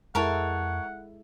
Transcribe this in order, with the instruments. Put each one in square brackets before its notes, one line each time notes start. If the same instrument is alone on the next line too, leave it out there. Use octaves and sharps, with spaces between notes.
[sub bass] F2 [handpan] G#3 E4 A4 [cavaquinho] A#4 C#5 A5 [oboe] F#5